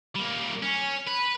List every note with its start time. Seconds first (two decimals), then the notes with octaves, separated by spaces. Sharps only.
0.16 G3 A#3
0.62 C#4
1.07 B4